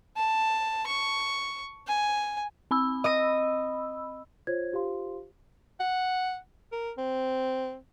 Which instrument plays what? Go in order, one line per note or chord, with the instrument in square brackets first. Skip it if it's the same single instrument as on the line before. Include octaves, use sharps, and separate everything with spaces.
[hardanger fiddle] A5
C#6
G#5
[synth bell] C4 B5 E6
[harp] D#5 D#6 D#7
[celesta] F4 C5 C#5 G#6
F4 G4 C5 F5 C6
[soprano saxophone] F#5
A#4
C4